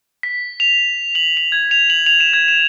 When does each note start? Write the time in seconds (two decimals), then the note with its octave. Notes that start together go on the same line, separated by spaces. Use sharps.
0.23 B6
0.60 F7
1.15 F#7
1.37 F7
1.52 G#6
1.71 F7
1.90 F#7
2.06 F7
2.20 E7
2.33 G#6
2.48 E7